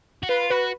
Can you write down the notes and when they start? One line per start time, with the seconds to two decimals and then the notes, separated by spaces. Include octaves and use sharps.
0.23 F#4
0.29 F4 B4
0.50 F#4 B4